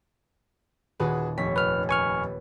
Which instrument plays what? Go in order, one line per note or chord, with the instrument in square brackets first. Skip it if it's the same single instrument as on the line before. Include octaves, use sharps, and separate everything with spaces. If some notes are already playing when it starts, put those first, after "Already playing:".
[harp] D#1 [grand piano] F#4 G#4 B4
[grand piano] F1 B6 [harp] C#5
[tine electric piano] B4 F6
[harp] B4 [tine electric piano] G#5 C#6 F6